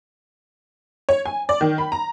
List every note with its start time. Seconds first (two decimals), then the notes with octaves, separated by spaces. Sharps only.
1.09 C#5
1.26 G#5
1.49 D5
1.61 D#3
1.78 B5
1.92 A#5